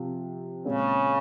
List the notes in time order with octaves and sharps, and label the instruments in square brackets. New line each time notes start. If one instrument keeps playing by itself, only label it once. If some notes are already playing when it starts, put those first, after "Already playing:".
Already playing: [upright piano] C3 F3 C4 G4
[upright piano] A#2 G#3 C4 [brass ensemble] C#3